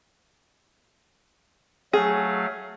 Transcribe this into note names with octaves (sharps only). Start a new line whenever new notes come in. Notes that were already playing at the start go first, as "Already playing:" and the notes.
F#3 A3 G#4 F5